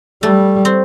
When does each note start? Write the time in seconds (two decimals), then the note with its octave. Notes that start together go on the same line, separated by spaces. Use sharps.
0.23 G3 A3
0.65 C4